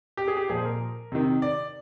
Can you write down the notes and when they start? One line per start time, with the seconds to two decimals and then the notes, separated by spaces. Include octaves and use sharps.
0.17 G4
0.28 G#4
0.37 G4
0.49 A#2 F3 G#4
0.57 C5
0.65 A#4
1.12 C3 D#3
1.42 D5